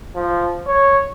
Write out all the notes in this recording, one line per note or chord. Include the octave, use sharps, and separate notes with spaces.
F3
C#5